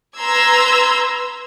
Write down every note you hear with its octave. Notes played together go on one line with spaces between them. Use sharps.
B4 A#5 C6 E6 G#6